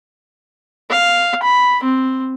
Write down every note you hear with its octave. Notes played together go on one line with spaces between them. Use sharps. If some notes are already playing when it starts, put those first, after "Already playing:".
F5
B5
C4